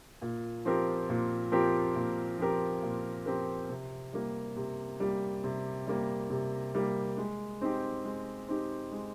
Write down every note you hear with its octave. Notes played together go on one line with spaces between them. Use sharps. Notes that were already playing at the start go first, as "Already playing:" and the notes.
A#2
F3 C4 G4 A#4
A#2
F3 C4 G4 A#4
A#2
F3 C4 G4 A#4
A#2
F3 C4 G4 A#4
C3
G3 A#3
C3
G3 A#3
C3
G3 A#3
C3
G3 A#3
G#3
C4 D#4 G4
G#3
C4 D#4 G4
G#3